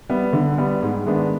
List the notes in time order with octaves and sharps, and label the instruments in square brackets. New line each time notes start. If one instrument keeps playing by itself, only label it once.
[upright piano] G3 B3
D3
G3 B3
G#2
D#3 G#3 B3 D4